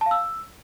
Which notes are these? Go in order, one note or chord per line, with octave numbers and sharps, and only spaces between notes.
A5
F5
E6